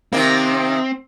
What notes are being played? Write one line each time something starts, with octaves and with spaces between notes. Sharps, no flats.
C3 D#3 A#3 C4